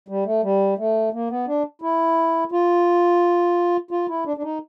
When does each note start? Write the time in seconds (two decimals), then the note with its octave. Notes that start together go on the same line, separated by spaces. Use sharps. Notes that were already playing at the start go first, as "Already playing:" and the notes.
0.08 G3
0.26 A3
0.43 G3
0.78 A3
1.13 A#3
1.30 B3
1.47 D4
1.82 E4
2.52 F4
3.91 F4
4.08 E4
4.26 D4
4.37 D4
4.43 D#4